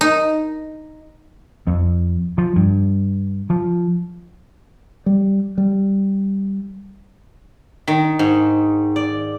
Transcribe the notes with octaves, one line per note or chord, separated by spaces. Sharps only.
D#4
F2
F3
G2
F3
G3
G3
D#3
G#2
D5